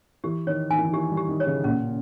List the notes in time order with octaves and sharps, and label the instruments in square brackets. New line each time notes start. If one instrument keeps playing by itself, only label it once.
[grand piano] E3 [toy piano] G4
[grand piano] D#3 [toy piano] C#5
[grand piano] D#3 [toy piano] G#5
[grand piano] E3
D#3
[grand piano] E3 [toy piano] G4
[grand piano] G3
[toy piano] G4
[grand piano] D#3
[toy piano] C#5
[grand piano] C#3
[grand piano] A#2 [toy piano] C#4